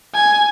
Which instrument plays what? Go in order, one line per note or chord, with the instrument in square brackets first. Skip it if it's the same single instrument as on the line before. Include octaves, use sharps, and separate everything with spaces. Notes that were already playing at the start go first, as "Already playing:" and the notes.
[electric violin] G#5